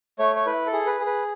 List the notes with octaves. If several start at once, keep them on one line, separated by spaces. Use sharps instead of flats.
A3 C#5
C#5
E4 B4
A4
G#4
B4
G#4
B4